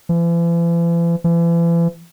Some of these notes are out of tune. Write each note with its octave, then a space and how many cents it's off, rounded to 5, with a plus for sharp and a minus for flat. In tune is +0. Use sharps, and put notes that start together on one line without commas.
E3 +45
E3 +40